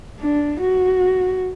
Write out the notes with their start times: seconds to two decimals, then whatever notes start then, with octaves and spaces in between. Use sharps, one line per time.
0.20 D4
0.61 F#4